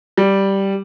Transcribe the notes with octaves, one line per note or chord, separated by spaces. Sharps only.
G3